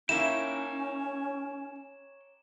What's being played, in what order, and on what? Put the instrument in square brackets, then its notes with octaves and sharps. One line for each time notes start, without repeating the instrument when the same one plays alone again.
[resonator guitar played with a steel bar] A#3 D#4 E4 [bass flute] C#4 [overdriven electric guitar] C#5 G5 [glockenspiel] E7